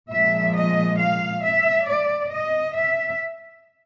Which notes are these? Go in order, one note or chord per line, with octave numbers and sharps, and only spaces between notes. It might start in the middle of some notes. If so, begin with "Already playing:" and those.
A#2 F3 G#3 E5
D#5
F5
E5
D5
D#5
E5